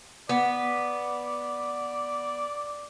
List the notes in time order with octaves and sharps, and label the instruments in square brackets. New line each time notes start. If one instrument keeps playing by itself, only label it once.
[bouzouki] B3 [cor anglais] D5